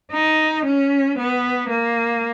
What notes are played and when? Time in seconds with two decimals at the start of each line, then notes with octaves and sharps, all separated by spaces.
0.12 D#4
0.66 C#4
1.18 B3
1.70 A#3